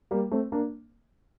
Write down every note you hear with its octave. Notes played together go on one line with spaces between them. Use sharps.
G3 A#3
A3 C4
A#3 D4